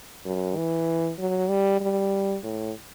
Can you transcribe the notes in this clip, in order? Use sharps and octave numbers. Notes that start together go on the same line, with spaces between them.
F#2
E3
F#3
G3
G3
A2